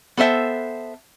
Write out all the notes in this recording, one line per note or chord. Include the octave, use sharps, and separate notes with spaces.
B3 A4 C5 E5 G5